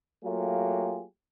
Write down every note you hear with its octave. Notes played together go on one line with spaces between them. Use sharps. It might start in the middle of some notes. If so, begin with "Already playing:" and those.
F#3 A3 A#3 F4 G4 G#4